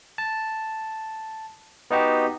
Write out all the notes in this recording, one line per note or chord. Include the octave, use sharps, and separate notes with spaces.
A5
B3 D#4 F#4 G4